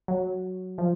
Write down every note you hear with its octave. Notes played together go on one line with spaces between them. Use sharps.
F#3
F3